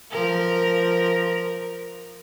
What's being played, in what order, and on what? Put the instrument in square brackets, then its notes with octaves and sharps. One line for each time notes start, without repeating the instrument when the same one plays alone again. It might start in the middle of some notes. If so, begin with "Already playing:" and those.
[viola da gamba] F3 A#4